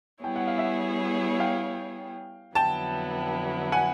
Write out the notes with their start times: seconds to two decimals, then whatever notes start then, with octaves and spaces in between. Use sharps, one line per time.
0.24 G3 B3 E4 G#4 C#5 G5
0.36 F#5
0.47 F5
0.58 E5 F#5
1.40 F5 G5
2.55 F2 D3 F#3 B3 E4 G5 A5
3.72 F#5 G#5